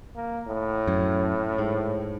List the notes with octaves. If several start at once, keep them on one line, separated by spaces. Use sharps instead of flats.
A#3
A2
F#2
G#2